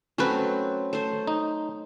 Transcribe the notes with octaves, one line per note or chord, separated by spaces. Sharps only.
F#3 A3 C4 C#4 B4
A3 C5
D#4